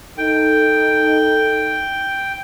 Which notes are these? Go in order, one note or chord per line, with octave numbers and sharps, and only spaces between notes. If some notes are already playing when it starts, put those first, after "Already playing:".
D#4 A4 G5